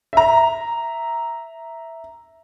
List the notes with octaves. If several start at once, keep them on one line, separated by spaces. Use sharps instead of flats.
E5 A#5